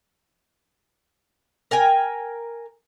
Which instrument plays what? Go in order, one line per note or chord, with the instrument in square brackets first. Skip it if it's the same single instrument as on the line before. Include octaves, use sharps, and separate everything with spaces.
[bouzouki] A#4 G5 G#5